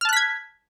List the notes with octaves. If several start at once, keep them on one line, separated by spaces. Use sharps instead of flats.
A5 F6 F#6 G#6 B6